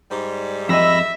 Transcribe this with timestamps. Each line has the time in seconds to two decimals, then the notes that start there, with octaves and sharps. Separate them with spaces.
0.11 G#2 G3
0.69 F2 D#5 E5 B5 E6 A#6